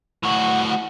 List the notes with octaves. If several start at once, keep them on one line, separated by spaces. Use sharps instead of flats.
A2 F#4